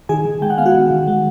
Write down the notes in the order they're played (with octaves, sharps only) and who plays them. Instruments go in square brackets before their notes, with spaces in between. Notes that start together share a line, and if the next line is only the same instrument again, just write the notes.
[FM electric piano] D#3 G#4 G#5
D#3
G#3 G5
F#5
B3 F5
F#4 F#5
D#3
D#3
G#3